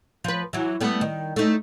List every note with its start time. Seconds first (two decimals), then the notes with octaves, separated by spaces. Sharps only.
0.24 F3 B4
0.53 E3 F#3
0.81 G3 A3 B3
1.01 D#3
1.36 A3 D#4